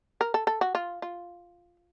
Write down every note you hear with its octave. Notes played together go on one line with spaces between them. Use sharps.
A#4
A4
A4
F#4
F4
F4